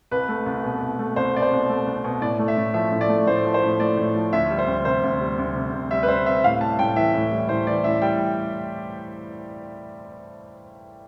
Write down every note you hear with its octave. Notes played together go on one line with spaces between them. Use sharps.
C2 B4
A3
C2
B2
C2
A3
C2 C5
B2 D5
C5
C2
A3
C2
B2
A2 D5
A3
E5
A2
F3 E5
A2
D5
A3
A2 C5
F3
C5
A2
A3 D5
A2
F3
D2 E5
G3
C5
D2
C3 C5
D2
G3
D2
C3
D2
G3 E5
B4
D2 C5
C3 E5
A2 F5
G3 A5
A2 G5
E3 E5
A2
G3
A2 C5
E3 D5
A2 E5
G3 G5